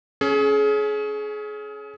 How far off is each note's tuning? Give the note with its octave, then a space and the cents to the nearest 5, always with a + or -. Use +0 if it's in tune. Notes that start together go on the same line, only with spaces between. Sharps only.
C#4 +0 G#4 +30